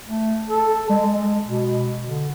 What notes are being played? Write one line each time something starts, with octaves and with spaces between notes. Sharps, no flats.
A3
A4
G#3
B2
D3